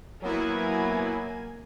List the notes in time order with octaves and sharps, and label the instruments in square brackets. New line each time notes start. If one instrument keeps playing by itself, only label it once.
[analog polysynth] F#3 B3 E4 [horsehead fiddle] A#3 G#5